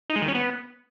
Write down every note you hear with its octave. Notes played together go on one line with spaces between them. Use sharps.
D#4
G#3
D#3
C#4
B3